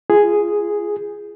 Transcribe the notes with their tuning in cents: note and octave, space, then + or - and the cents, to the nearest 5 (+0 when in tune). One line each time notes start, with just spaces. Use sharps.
F4 -25 G#4 +0